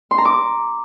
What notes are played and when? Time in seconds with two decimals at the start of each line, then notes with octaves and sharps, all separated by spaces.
0.11 C6
0.18 A#5
0.25 D6